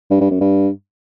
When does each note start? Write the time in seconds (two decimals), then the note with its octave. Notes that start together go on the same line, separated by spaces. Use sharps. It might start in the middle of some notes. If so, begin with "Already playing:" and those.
0.11 G2
0.21 G2
0.31 F#2
0.41 G2